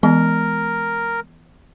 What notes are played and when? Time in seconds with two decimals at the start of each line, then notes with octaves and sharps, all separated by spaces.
0.03 E3 G#3 B3 A#4